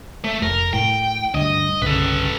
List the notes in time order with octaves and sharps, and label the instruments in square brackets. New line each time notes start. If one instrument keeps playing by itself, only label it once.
[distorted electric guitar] A3
[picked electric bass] F1 [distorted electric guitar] A#4
[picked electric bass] A2 [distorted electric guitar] G5
[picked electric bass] D2 G2 [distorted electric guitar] D#5
[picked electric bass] G1 C2 C#3 [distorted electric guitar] A4 B4